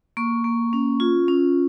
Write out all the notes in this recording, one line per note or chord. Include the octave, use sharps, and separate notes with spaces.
A#3 C#6
A#3
C#4
F4
C#4